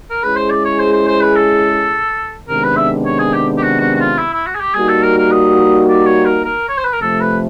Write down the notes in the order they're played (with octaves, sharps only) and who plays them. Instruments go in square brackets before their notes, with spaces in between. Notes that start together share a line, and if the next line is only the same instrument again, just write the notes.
[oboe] A#4
[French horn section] G#3 C#4 E4 G#4 [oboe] B4
[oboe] C5
D5
C#5
C5
C5
C5
B4
A4
[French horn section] C3 D#3 G#3 B3 D4 [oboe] A#4
[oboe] B4
E5
C#5
G#4
G4
G4
F#4
F#4
F#4
F4
E4
E4
F#4
G#4
G4
[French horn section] G3 A#3 D#4 F#4 [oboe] G#4
[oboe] A4
A#4
A#4
D#5
D5
C#5
A#4
A#4
C#5
C5
B4
A#4
[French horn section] C3 F3 A3 [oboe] A4
[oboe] B4